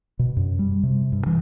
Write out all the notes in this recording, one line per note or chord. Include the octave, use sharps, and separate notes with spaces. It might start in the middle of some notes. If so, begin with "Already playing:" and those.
B2
F#2
G3
C3
G2
E3